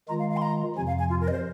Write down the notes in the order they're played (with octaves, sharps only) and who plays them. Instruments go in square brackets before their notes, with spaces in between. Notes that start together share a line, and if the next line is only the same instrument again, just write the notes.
[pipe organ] D#3 G#3 F4 [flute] A#5
[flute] F5
F5
C6
A#5
[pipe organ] F2 C3 F3 [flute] G#5
[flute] F5
G#5
F4
A#4
D#5
C5